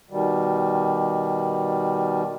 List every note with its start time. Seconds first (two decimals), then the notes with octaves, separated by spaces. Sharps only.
0.10 B2 D#3 G3